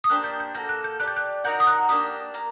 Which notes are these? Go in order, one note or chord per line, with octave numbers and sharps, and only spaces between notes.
D#6
A#3 D4 G4 C5 F#6
G6
G6
A#3 F#4 A4 G6
F#6
G6
G4 D5 A5 F#6
G6
F#6
D#4 F#4 A#4 F#5 G6
D#6
F#6
A#3 D4 G4 D#6
A#3